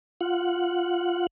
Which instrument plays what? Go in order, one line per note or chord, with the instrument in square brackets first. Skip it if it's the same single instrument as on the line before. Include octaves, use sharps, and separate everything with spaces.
[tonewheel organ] F4 F#5